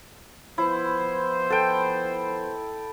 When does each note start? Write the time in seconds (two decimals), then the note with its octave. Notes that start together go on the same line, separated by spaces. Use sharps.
0.58 F3 B3 E4 C5
1.50 A4 G5